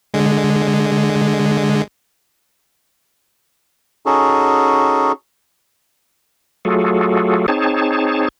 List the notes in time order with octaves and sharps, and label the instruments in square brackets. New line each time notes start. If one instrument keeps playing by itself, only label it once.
[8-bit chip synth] D3 G#3
[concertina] C#4 D#4 F#4 G#4 A4
[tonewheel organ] F#3 A3 F4 F#4 G#4 A4
C4 D#4 G#4 C#5 A5